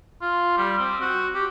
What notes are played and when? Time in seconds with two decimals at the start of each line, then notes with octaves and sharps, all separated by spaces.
0.21 F4
0.57 G3
0.79 C4
1.01 F#4
1.34 G4